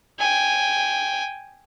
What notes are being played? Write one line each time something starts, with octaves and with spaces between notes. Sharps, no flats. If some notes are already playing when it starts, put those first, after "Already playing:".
G5 G#5